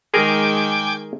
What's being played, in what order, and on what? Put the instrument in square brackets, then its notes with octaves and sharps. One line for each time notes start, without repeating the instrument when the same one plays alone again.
[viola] D#3 G#3 [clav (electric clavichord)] G#4 A#4 [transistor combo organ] G5 G#5 D6